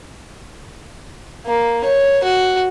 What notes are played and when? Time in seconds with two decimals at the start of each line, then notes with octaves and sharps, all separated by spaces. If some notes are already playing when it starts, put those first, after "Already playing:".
1.46 A#3
1.85 C#5
2.24 F#4